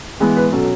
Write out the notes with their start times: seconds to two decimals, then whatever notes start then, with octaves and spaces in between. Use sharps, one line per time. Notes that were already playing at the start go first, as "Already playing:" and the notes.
0.20 E3 G#3 B3 G#4
0.37 B4
0.52 B2 F#3 C#4 A4